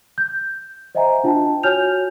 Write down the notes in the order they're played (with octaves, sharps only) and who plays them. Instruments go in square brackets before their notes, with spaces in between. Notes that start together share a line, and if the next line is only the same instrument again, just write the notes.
[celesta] G6
C5 D#5 E5 F#5 G#5 A#5
D4 F4 G5 A5
F#4 C#5 G#5 F6 G6 F7